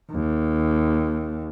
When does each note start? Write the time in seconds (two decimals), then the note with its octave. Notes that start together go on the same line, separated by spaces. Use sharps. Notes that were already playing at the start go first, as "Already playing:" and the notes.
0.12 D#2